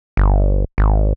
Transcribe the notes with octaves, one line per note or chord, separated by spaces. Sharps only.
G1
G#1